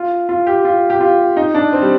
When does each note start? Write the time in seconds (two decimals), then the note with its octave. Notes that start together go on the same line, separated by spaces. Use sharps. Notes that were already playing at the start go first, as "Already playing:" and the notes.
Already playing: F4
0.29 F4
0.47 G4
0.65 F4
0.90 G4
1.01 F4
1.37 D#4
1.54 D4
1.73 C4
1.82 G3